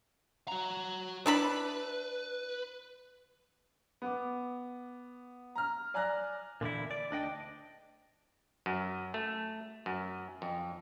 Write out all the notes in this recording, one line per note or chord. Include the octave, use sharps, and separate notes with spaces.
F#4 A#5
D4 E4 B4 B5
B3 D6
A#5 F6
D5 G#5 A#5 F6 F#6 A#6
A#2 D3 E3 E4
D5
D2 D4 D#5 G5
F#2
A3
F#2
F2